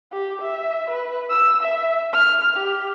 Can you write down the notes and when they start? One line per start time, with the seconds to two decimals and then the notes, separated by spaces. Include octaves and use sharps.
0.13 G4
0.42 E5
0.91 B4
1.30 E6
1.63 E5
2.13 F6
2.57 G4